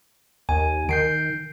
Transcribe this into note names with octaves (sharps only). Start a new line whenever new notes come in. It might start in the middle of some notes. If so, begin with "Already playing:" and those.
D#2 G#5
D#3 G6 C7 D7